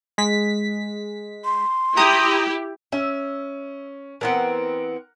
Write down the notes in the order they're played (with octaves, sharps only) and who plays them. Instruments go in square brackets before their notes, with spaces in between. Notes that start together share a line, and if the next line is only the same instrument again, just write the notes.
[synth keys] G#3 B6
[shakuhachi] C6
[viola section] E4 G4 [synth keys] A#5 D#6
[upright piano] C#4 [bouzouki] E5
[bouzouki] E3 B3 C4 [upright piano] A#4 F#5